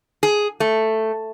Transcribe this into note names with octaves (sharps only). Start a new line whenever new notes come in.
G#4
A3